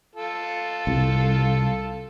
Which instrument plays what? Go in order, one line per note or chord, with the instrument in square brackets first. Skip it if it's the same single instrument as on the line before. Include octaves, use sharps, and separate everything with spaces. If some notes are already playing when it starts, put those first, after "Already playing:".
[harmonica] F4 A4
[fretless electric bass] C2